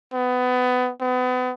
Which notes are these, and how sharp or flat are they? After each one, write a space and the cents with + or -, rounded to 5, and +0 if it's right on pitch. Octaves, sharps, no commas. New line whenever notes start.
B3 +25
B3 +35